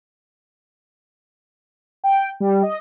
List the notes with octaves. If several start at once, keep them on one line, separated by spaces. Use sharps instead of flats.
G5
G3
D#5